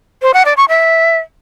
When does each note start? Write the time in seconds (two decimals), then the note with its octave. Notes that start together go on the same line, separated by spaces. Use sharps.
0.22 C5
0.34 F#5
0.45 D5
0.57 C#6
0.69 E5